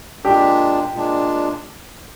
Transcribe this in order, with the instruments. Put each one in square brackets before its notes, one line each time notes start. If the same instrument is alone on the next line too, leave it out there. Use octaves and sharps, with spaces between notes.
[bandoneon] A#2 G#3 D4 [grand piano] G4
[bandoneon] A#2 G#3 D4